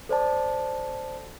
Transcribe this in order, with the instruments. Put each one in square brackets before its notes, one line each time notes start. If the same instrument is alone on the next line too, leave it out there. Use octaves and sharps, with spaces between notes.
[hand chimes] A4 C5 D5 A5